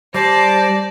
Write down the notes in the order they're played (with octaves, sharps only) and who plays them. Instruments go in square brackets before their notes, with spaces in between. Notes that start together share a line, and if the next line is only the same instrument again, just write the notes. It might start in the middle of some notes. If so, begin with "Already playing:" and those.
[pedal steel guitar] G3 [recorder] C5 [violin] D5 A5 [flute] A#6